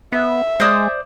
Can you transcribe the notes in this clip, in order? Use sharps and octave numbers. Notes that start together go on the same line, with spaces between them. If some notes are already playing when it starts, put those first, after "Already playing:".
B3 E5
G#3 C5 D5 D#6